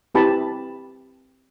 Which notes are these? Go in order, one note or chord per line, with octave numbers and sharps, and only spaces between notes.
C4 E4 G4 B4 A5 B5